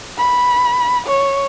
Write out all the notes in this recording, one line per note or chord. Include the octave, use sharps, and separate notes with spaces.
B5
C#5